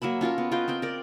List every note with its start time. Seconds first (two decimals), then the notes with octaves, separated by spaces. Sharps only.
0.02 F#3 A#3 E5 B5
0.21 C#4 F4 A4 A#4
0.38 B3
0.52 F4 B4 D#5 G5
0.68 C4 A#4 G5
0.82 A#4 D5